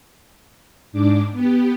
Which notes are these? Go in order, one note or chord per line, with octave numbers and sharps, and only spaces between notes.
G#2 D4 D6
B3 G4